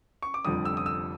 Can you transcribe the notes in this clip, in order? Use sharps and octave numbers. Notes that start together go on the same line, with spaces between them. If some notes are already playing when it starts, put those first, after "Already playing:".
C#6
D6
F1 F2 D3 G3 D#6
E6
D#6
E6